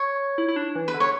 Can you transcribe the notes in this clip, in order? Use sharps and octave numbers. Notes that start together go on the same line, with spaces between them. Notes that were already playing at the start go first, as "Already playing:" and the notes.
Already playing: C#5
E4
E4
D4
E3
B4
D3
C#5